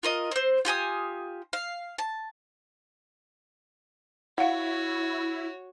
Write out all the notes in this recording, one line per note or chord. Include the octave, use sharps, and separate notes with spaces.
F4 A#4 D#5
C4 C5
F4 G4 G#5 D#6
F5
A5
E4 F#4 C#5 F5 F#5